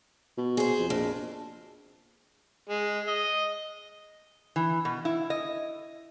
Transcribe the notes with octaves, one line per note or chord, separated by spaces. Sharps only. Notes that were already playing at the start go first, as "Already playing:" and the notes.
B2
G#4 C5
F2
A#1 F2
G#3
D#5
E3
B2
E4
D#5